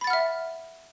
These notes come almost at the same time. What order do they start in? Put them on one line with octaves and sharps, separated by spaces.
B5 A6 F#5 F6 E5